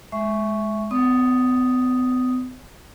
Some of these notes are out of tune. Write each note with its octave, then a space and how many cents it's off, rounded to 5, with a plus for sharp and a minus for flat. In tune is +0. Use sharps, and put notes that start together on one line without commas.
G#3 +15 E5 +0 C#6 +0
B3 +45 D5 -25 D#6 +0